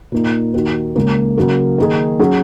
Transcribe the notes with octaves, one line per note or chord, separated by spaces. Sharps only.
A#2 A#3 D#4
D#2 D#3 A#3 F#4
C#2 C#3 A#3
C#3 F#3 A#3 F#4 A#4
D#3 A#3 D#4 G#4
F#3 C#4 G#4